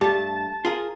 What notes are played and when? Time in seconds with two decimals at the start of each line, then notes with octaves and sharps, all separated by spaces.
0.01 G2 A3 G4 A5 A6
0.65 F4 G#4 A#4